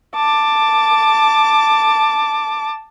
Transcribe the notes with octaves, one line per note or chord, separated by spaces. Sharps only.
A5 D6